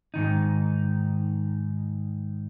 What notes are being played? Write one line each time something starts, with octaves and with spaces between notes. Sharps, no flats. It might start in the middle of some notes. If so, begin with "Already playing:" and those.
G#2 D#3 D#4